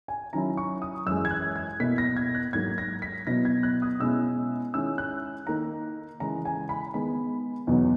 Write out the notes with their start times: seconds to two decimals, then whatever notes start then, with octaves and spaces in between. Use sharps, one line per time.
0.08 G#5
0.33 D#3 F#3 C#4 E4 A#5
0.57 C#6
0.82 D#6
1.06 F#2 E3 G#3 E6
1.25 G#6
1.31 F#6
1.56 G#6
1.80 B2 A#3 E4 B6
1.98 A#6
2.16 G#6
2.35 F#6
2.53 G#2 F#3 A#3 G#6
2.78 A#6
3.02 B6
3.27 B2 F#3 B3 E4 A#6
3.45 G#6
3.63 F#6
3.82 D#6
4.00 B2 G#3 C#4 E4 E6
4.74 D#3 G#3 C#4 E4 E6
4.98 F#6
5.47 D#3 A#3 D#4 A#5
6.20 C#3 E3 G#3 A#5
6.45 G#5
6.69 B5
6.94 D#3 G#3 B3 B5
7.67 E2 B2 F#3 B3 D#4